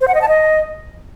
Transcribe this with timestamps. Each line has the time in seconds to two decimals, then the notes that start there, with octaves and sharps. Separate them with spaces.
0.01 C5
0.08 F#5
0.15 D#5
0.21 A5
0.28 D#5